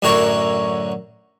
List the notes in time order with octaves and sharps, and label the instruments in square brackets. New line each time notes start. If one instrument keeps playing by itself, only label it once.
[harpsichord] F#2 A2 D3 F#4 A#4 C#5